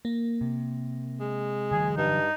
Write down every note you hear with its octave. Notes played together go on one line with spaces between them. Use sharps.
A#3
C3
G#3
D3 E3 F#3 G#4
G2 D#4